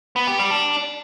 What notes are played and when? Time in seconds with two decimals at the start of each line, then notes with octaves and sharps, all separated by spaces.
0.16 B3
0.27 G4
0.39 G3
0.51 D4